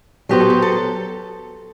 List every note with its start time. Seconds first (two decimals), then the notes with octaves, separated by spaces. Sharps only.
0.29 F#3 B3 F#4 G4 C5
0.40 A4
0.50 G4
0.62 A4